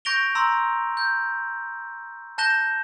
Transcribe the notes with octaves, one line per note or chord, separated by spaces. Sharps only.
C#6 G6 A#6 D7 F7 G7
A#5 C6 E6
G6
A5 F#6 G6 A#6 E7 G7